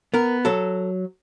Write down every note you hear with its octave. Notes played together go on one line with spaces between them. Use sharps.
B3 A#4
F#3 A4